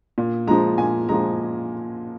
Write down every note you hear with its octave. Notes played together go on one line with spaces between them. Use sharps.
A#2
F3 G#3 A#5
A#2 G#5
F3 G#3 A#5